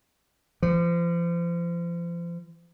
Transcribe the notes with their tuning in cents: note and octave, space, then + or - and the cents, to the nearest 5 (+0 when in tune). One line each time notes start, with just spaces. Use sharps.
F3 -35